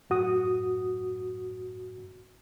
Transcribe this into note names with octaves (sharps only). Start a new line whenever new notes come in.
F#2 A2 F#4 D#6